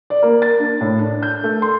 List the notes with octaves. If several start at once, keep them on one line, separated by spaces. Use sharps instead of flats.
D5
A#3
A6
D4
A2
D4
G6
A3
C6